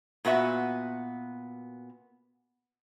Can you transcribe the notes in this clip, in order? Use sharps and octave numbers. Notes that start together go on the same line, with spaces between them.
A#2 B3 F#4 E5